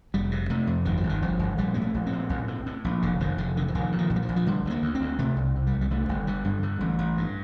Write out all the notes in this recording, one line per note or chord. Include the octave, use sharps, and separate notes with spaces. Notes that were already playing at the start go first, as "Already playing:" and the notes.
F1 G3
C3
C3 A3
F2
G1 D#3
F3
G1
D#3
G1 F3
G1
A#1 G3
A2 A#3
A3
A#1
C4
A2
A#1
A2
A2
A#1
F1 D3
F1 D#3
F1 D3
D3 D#3
F3
A#1 D#3
A#2
D#3
A#1
G3
F3
A#1
F3
D3 G3
D2 A3 A#3
D2
C4
D2
C3 A3
C2
C3
G3
C2
G3
D3 A3
G1
D3 G3
G2
D3
A1
A1
G2